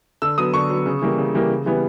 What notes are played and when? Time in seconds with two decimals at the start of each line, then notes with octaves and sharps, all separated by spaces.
0.22 D3 E6
0.38 F#3 B3 D#6
0.54 D3 C#6
0.70 F#3 B3
0.86 C#3
1.02 E3 G3 A#3
1.18 C#3
1.34 E3 G3 A#3
1.50 C#3
1.66 E3 G3 B3